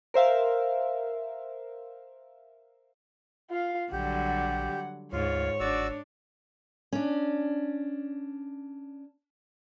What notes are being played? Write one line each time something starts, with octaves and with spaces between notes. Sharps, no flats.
A#4 C5 E5 F5
F4 F5
A#1 D3 F#3 G3 G4 F#5
D2 G#2 F4 C#5
G1 D4 F#4 D5 E6
C#4 D4